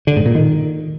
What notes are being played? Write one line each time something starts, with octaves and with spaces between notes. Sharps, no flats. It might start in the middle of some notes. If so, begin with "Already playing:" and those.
D3
G#2
A#2
D#3